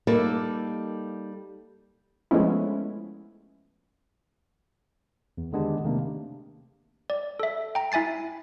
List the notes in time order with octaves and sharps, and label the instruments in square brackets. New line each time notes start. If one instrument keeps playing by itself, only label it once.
[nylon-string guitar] G3 A#3 D#4 A4
[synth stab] F3 G#3 A3 B3 C#4 E4
[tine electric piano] E2
D3 D#3 G#3 B3 D4 G4
C3 D#3 A3 A#3 D4
[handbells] D5
A4 E5
G5 A#5
E4 E5 G#5 A6 C7